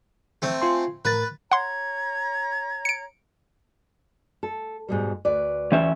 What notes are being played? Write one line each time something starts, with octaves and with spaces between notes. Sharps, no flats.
A3 C4
F4 G#5 C6
A2 A#4 B4 A6
C#5 F#5 A#5 C6 G#6
C#7 D7
A4
G#2 B2 G3
D2 B4 D5
E3 C#4 E5